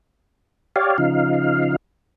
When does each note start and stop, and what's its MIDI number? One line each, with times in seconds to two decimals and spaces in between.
0.76 0.97 67
0.76 0.97 73
0.76 0.97 74
0.76 0.97 77
0.98 1.76 49
0.98 1.76 53
0.98 1.76 63
0.98 1.76 77